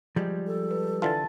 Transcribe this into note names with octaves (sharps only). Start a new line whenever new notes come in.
F3 G3 G#3
A4
B4
D3 E3 F4 A5 A6